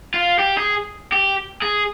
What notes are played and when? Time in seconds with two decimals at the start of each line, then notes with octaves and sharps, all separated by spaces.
0.14 F4
0.39 G4
0.58 G#4
1.13 G4
1.62 G#4